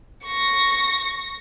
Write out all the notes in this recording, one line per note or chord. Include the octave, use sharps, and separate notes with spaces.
C#6 A#6